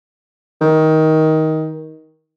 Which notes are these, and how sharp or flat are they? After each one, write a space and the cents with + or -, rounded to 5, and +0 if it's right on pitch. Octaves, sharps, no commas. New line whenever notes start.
D#3 +15